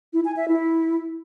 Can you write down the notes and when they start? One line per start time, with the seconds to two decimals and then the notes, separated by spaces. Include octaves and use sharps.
0.13 E4
0.25 G#5
0.37 E5
0.48 E4